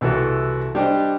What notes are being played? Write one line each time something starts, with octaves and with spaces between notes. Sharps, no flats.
C2 E3 F#4 A4
G3 D4 G4 C5 D#5